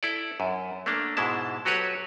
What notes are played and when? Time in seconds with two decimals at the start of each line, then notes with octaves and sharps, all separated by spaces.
0.03 E4 A4 D5
0.40 F#2
0.86 A3 A#3 D4
1.17 G#2 B2 G#3 E4 A5
1.65 F#3 F#4 G4 A4 B4 C#5